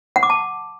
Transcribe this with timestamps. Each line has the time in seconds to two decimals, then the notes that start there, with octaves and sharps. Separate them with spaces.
0.16 F#5
0.23 D6
0.30 A5